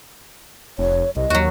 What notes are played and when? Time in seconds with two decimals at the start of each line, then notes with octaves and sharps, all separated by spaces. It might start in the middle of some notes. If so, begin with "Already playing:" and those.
0.78 F1 C#5
1.16 C2 D#5
1.30 D#2 F#3 F#4